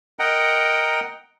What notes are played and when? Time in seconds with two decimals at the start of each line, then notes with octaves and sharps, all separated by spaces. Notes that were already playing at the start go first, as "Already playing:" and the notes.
0.19 A#4 D#5 F#5 G5 A#5